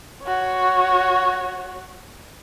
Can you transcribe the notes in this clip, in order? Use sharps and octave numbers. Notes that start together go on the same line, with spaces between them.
F#4 C#5